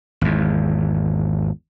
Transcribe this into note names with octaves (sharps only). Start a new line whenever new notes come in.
G#1 E2